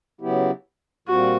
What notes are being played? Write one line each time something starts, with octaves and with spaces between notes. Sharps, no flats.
C#3 F#3 B3 E4 G4
A#2 G3 C4 F4 F#4